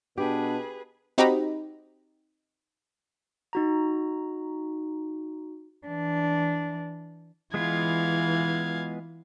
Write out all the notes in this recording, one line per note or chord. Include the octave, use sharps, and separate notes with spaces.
B2 D4 G4 G#4 B4
C4 D#4 F#4 G4 A#5 B5
D#4 F#4 A#5
E3 D4
E3 G#3 B3 F4 F5 G#6